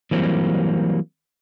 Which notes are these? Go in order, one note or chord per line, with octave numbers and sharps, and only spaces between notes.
E3 F#3 G3 A#3 C4